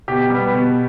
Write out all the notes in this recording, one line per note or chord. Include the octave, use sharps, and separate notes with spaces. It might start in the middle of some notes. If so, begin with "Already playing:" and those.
B2 G4
G3 B3
B2